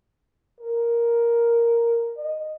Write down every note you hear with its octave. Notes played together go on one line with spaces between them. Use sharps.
A#4
D#5